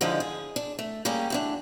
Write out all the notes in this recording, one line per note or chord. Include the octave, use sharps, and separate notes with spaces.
D3 D#3 F3 G#3 E4 A4
G#4
D4
A3
G3 A#3 C#4 G4 G#4
D2 E3 D4